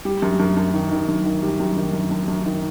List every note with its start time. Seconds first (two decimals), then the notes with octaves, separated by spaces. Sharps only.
0.05 G3
0.22 F#2
0.40 F#2
0.57 F#2
0.74 D#3
0.91 D#3
1.08 F#2
1.26 D#3
1.42 G3
1.60 F#2
1.77 D#3
1.93 F#2
2.11 F#2
2.28 F#2
2.46 D#3